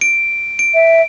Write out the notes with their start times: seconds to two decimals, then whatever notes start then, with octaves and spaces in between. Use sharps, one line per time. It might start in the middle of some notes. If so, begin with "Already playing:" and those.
0.01 D7
0.59 D7
0.74 E5